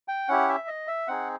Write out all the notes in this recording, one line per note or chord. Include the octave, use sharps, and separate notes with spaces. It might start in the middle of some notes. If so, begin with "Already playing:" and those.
G5
C#4 E4 G4 F#5
E5
D#5
E5
C4 D#4 G#4 F#5